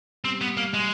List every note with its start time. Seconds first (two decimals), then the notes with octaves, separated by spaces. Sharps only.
0.25 G3 C4
0.41 B3
0.57 A#3
0.74 G#3